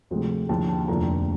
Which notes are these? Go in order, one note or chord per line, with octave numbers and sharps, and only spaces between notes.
D2 C3 F3 G#3
D#2 D3 F3 A5
A5
F1 D#2 D3 F3 A3 A#5